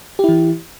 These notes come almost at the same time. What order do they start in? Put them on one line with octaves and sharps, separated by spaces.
G4 E4 E3